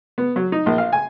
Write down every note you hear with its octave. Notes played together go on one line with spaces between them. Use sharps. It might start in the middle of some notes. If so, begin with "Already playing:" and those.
B3
F#3
D#4
A#1
F5
G#5